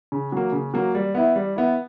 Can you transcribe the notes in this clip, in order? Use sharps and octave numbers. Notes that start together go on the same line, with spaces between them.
C#3
F#3 A#3
C#3
F#3 A#3
G3
B3 E4
G3
B3 E4